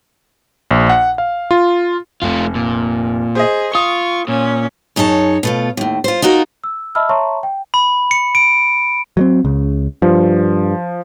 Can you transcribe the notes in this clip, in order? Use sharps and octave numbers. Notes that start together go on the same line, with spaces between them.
A#1
F#5
F5
F4
F1 A3 F4
A#2
G#4 C5 D#5
F4 C#6 D#6
A#2 C#4
F#2 D#4 G#4 C#5 A5
B2 A3 F4
D#2 A2
F4 C5
D#4 F4 F#4 A#4
E6
D#5 E5 A5 B5 E6 F6
C#5 E5 A5 A#5 C6 C#6
G5
B5
C#7
D7
F#3 G3 C4
C#2 C#3
G2 F3